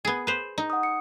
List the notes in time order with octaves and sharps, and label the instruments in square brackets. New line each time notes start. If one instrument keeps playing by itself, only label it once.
[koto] B3 G#4
B4 C5
D#4
[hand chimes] F#5 D#6
C#7